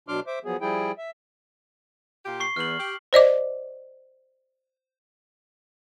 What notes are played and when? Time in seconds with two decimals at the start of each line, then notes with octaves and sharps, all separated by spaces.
0.08 B2 F#3 D4 C6 D6 F6
0.27 C5 E5 D6
0.45 F3 F#3 B3 G#4
0.61 F3 G3 E4 G#4 G5
0.98 E5
2.25 A#2 F4 G4
2.40 C#6 C7 G7
2.56 E2 F6 F#7
2.78 G4
3.13 C5 D5 D#5 D6